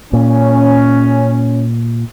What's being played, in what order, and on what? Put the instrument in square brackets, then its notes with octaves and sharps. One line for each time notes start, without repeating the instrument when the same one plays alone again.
[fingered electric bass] A#2 [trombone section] C#4